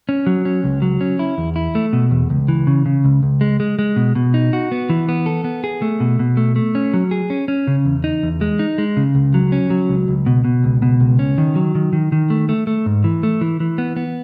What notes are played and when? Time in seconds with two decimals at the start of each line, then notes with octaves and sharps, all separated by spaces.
0.09 C#4
0.27 F#3
0.45 C#4
0.64 C#2
0.82 F#3
1.01 C#4
1.19 E4
1.38 E2
1.56 E4
1.75 A3
1.93 B2
2.11 E2
2.30 C#2
2.48 E3
2.67 C#3
2.86 C#3
3.05 C#2
3.23 C#2
3.41 G#3
3.60 G#3
3.79 G#3
3.96 B2
4.15 B2
4.34 D#4
4.53 F#4
4.72 B3
4.90 E3
5.09 B3
5.26 A4
5.45 B3
5.64 G#4
5.82 A3
6.00 B2
6.19 B2
6.37 A3
6.56 A3
6.75 C#4
6.94 F#3
7.11 G#4
7.30 C#4
7.48 C#4
7.67 C#3
7.85 E2
8.04 D#4
8.23 E2
8.41 G#3
8.59 D#4
8.78 G#3
8.97 C#3
9.15 C#2
9.34 F#3
9.52 C#4
9.70 F#3
9.89 C#2
10.08 C#2
10.26 B2
10.45 B2
10.64 C#2
10.82 B2
11.00 C#2
11.19 C#4
11.38 D#3
11.55 F#3
11.75 D#3
11.93 D#3
12.12 D#3
12.30 A3
12.49 A3
12.67 A3
12.86 G#2
13.04 E3
13.23 A3
13.41 E3
13.60 E3
13.78 B3
13.96 B3